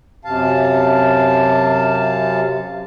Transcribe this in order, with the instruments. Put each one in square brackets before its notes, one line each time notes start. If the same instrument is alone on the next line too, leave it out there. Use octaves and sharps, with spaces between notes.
[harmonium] F#2 C3 F5 A5